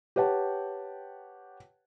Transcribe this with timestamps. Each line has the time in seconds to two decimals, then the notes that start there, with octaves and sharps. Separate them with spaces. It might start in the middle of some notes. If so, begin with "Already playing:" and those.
0.16 G4 B4 C#5 F#5 G5 A5